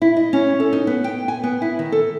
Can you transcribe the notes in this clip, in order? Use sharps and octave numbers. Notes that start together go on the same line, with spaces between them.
E4
D#5
C#4
A4
D#4
B3
G5
G#5
B3
E4
D#3
A4